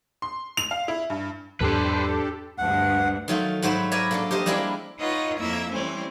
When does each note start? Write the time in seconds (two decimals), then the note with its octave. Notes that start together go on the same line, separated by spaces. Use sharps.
0.22 C6
0.57 F7
0.71 F5
0.88 E4
1.10 G2
1.60 E2 G#2 F#3 D4 G4 A4 B4 C5
2.58 D2 G2 F#5
3.28 D#3 F#3 A3 F4
3.62 G#2 F#3 F#4 C5 E5 B5
3.91 A#4 B4 D5 E5 G#5 A#5
4.11 A#3 D4 A4
4.31 G4 A#4 C5 D#5
4.46 G3 G#3 A#3 C4 D4 E4
4.98 D#4 F4 B4 C#5 D#5 F#5
5.38 F2 A#3 E4 E5 G#6
5.72 E3 G3 A3 C4 C#4 C5